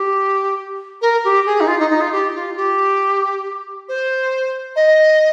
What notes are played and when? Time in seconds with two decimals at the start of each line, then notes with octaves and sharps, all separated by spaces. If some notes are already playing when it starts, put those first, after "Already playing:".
Already playing: G4
1.01 A#4
1.24 G4
1.46 G#4
1.60 D#4
1.67 F4
1.79 D#4
1.90 D#4
2.01 F4
2.12 G4
2.34 F4
2.56 G4
3.89 C5
4.76 D#5